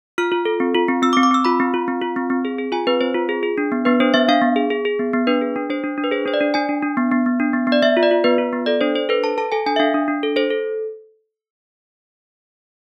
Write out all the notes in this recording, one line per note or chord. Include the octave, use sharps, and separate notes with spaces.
F4 F6
F4
A4
C4
F4
C4
C4 E6
D6
C4
D6
C4 E6
F4 B5
C4
F4
C4
F4
C4
C4
G#4
G#4
F4 G#5
C4 B4
C4 C5
F4
G#4
G#4
D4
B3
B3 B4
D4 C5
B3 E5
D4 F5
B3
G#4
G#4
G#4
B3
B3
D4 B4
G#4
D4
D4 C5
D4
D4
B4
G#4 C5
D4 C5
D5
D4
D4 G#5
D4
D4
B3
B3
B3
D4
B3
B3
D5
B3 E5
F4
D5
F4
B3 B4
F4
B3
A4 D5
D4 C5
D4 C5
A4 B4
A4 A5
A4 A5
A4 G#5
D4 G#5
E5
D4 F5
D4
D4
A4
A4 C5
A4